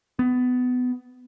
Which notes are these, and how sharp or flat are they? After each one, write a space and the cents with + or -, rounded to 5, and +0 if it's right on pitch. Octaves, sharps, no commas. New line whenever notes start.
B3 +20